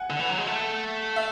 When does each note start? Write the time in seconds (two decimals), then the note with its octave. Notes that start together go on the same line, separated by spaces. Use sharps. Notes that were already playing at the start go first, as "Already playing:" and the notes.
Already playing: F#5 G#5
0.10 D3
0.19 E3
0.29 F#3
0.38 G#3
0.47 A3
1.16 E5